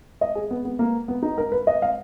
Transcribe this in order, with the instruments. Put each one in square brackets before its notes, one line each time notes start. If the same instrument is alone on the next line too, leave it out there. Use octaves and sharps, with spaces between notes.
[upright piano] D#5
G#4
B3
B3
A#3
B3
D#4
A#4
B4
D#5
F5